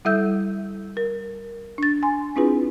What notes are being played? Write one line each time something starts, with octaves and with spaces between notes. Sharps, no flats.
G3 E4 A4 E5 E6 G6
A#4
D4 A6
G#5 C6
C4 D4 E4 F4 G#4 B4